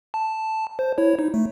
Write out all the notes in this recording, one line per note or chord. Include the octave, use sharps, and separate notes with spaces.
A5
C5
E4 C#5
D#4
A3